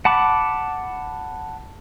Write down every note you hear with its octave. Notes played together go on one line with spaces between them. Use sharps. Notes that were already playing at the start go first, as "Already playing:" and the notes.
F#5 A5 B5 D6